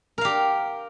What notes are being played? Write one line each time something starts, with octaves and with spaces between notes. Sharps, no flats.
G4 A#4 F5